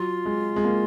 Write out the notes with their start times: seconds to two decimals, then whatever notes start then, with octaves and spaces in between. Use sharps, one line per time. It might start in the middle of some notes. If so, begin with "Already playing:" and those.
Already playing: F#3 F4
0.26 G#3
0.56 G#3
0.64 A#3